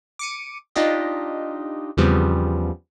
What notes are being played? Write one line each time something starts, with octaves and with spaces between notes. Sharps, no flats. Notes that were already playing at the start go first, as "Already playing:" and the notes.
D6 C#7 D#7
D4 D#4 F4 G4 D#5
E2 C#3 F3 G3 B3 C4